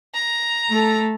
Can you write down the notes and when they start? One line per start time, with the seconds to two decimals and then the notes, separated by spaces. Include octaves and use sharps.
0.14 A#5
0.70 A3 A4